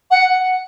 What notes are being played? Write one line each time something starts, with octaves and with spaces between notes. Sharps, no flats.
F#5